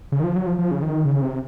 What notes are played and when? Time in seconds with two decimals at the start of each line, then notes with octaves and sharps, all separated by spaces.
0.12 C#3
0.20 D#3
0.24 F3
0.36 F#3
0.47 F3
0.58 F3
0.71 C#3
0.82 D#3
1.05 C#3
1.22 C3